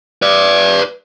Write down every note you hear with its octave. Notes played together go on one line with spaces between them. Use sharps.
B4 D5